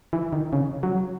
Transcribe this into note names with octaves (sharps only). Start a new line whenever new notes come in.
E3
D#3
C#3
F#3